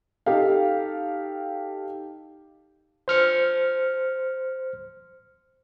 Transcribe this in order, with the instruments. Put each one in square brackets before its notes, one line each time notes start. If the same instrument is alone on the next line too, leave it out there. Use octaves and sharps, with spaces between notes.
[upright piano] D#4 G4 A4 F5
[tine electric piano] C5 F6 C#7